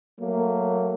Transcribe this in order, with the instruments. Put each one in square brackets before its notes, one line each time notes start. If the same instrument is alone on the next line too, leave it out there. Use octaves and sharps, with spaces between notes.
[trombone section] F#3 A3 A#3